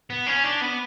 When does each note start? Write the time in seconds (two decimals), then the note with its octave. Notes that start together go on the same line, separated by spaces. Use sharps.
0.10 B3
0.27 C#4
0.44 D4
0.62 B3